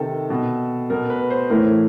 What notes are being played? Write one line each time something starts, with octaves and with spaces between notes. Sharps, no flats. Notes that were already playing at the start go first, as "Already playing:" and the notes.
Already playing: C3 D#3 A4
B2
B2 A#4
B4
C5
A2 E3 A#4